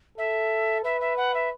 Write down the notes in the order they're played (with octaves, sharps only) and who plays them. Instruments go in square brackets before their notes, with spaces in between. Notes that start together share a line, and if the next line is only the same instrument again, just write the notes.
[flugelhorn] A4 [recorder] E5
[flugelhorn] B4 [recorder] E5
[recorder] E5
F#5
E5